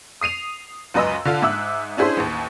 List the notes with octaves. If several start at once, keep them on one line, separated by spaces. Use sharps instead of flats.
D#6 C7 D#7 F7
C#2 F#2 B4 D#5 C6 E6
D3 D4 F4
G#2 E5 D6 E6 F#6
C#4 D4 E4 G#4 C5 C6
A1 D#2